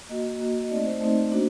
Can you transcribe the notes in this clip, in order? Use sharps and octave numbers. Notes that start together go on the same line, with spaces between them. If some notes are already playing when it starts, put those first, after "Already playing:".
A#3 F#4 D#5
A#3 F#4
D#5
A3 C4 D#4 D5
C5
A3 C4 D#4
A#3 D4 F#4